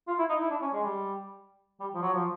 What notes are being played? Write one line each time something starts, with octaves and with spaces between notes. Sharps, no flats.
F4
E4
D#4
E4
D4
C#4
G#3
G3
G3
F3
F#3
F3